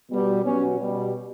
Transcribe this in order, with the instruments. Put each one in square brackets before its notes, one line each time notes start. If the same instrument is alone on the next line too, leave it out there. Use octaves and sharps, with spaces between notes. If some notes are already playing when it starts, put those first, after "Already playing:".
[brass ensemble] B2 G3
B2 F#3 C#4
B2 G3